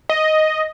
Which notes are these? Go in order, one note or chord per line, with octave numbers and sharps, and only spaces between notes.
D#5